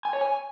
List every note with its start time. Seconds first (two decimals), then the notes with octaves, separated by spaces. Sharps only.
0.05 G#5
0.13 C#5
0.21 G#5